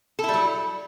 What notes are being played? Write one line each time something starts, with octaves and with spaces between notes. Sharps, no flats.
F#3 G3 E4 A4